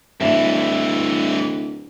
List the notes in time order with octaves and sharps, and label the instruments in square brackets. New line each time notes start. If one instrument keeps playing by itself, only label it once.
[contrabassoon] D1 [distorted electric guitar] G2 E3 [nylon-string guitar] D5 E5